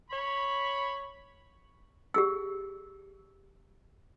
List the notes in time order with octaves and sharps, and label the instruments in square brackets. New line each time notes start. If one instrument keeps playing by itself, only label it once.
[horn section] C#5 B5
[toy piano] G4 G#4 E6